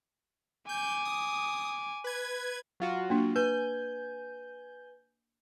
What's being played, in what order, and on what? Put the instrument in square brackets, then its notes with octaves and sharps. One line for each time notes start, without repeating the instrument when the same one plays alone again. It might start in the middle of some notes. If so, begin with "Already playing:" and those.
[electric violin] G#5 D6 [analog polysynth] G6
[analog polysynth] D#6
B4 G#6
[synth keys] F#3 F4 F#4
[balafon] A#3 D4
[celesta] B4 [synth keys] G#5 G6